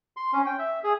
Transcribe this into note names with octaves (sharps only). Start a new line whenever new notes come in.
C6
C#4
G5
E5
G#4